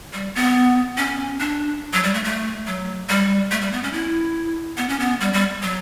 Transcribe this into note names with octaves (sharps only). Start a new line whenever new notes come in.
G3
B3
C#4
D4
F#3
G3
A3
A3
F#3
G3
A3
G3
B3
C#4
E4
B3
C#4
B3
G3
G3
F#3